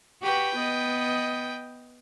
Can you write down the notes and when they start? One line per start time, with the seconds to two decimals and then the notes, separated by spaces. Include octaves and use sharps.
0.23 F#4 G4 B4 G5
0.56 B3 D#5